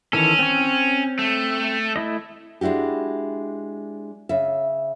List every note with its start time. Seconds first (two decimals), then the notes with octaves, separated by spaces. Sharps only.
0.13 D#3 E3 C#4 A4
0.39 C4 C#5
1.19 A3
1.96 A3 E4 D#5
2.61 G#3 D4 E4 F#4 G4
4.29 C#3 E5